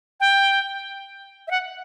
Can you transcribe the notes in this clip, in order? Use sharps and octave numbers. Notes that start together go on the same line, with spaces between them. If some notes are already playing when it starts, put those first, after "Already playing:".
G5
E5
F#5